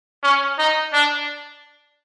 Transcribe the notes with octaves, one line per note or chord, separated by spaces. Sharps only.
C#4
D#4
D4